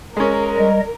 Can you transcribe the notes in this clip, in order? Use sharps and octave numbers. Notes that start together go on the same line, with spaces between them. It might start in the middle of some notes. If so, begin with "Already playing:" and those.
G#3 C#4 A#4
G3 D#5